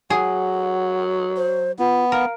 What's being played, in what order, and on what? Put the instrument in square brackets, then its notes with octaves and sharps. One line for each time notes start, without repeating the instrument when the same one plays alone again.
[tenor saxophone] F#3 [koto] G#4 [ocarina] F#5
[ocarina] C5
[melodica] B3 [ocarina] F4
[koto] A#4 [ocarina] F5